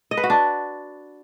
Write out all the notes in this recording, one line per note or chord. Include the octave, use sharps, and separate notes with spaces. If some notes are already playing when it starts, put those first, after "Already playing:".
D#5
B4
F#4
D4